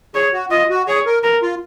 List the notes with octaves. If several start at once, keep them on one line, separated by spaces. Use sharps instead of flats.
G#4 C#5
F#4
F4 D#5
F#4
G#4 C#5
A#4
A#4
F4